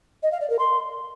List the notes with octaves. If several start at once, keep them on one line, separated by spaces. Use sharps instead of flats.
D#5
F5
D5
A#4
C6